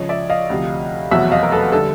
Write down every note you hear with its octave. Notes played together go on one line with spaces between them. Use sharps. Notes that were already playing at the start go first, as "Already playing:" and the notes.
Already playing: C#2 C#3 F3 C#5 D#5
D5 E5
D#5 F5
D2 C3 F3
F1 E2 B2 F#3 E5 F#5
D#5 F5
A#4
A4 B4
D3 G3 A4